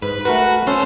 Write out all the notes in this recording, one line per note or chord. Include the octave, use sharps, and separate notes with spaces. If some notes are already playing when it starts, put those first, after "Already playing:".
G#2 B4
A3 F#4 A#4 B4
B1 C#4 A4 C5